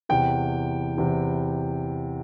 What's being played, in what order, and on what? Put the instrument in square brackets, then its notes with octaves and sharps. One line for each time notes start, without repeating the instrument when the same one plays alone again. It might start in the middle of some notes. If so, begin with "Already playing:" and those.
[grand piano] E2 C3 E3 G5
E2 C3 E3